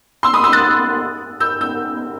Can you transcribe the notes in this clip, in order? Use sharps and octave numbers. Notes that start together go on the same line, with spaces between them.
C6 E6
B5 D#6
C6 E6
F#6 A6
E6 G6
E6 G6